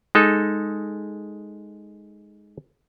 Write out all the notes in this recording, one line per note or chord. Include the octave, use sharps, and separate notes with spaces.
G#3 D#4 A4